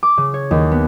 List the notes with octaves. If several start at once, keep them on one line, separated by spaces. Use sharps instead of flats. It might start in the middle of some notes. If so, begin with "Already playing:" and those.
D6
C#3
C#5
D#2
B3